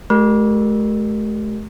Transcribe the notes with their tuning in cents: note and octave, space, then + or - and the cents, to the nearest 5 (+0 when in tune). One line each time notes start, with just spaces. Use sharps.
A3 -45 G4 -20 A#4 +0